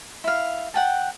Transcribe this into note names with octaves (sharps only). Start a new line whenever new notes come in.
E4 F5
F#5 G5 A5